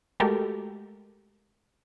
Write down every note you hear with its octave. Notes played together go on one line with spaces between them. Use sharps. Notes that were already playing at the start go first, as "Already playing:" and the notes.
G#3 A3 F#4 G4 A4 A#4